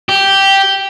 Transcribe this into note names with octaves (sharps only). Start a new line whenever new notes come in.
G4